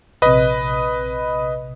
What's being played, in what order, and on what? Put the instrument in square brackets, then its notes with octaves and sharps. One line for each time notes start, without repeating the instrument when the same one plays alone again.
[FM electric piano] A#1 C3 [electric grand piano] B4 D#5